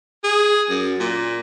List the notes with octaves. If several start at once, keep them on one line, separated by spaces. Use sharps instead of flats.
G#4
F#2
A#2